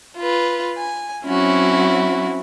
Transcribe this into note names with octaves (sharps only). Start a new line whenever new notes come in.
F4 B4
G#5
F#3 C4 C#4 E4 F#4